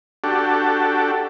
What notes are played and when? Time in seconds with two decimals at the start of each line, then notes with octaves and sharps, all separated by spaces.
0.24 D4 F#4 G4 A4